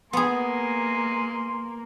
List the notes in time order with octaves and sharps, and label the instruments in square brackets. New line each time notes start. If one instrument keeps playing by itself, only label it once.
[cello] A#3 [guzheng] B3 G#4 [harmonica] G#5 C6